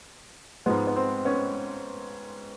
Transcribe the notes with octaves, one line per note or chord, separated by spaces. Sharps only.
G#2 F3 G#3 B3
B3
C4
B3 C#4